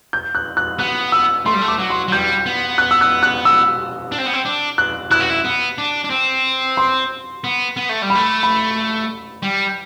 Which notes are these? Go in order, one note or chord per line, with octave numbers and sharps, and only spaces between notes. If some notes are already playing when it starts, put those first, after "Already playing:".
G6
F#6
F#6
B3 F#6
E6
A3 C6
G3
A3
D6
F#3
C6
F#3
G3 G6
B3
F#6
E6
F#6
F#6
E6
D4
C4
B3
C4
D4
F#6
E4 F#6
F#4
E4
B3
D4
D4
C4
C6
B3
B3
A3
G3
B5
A3
B5
G3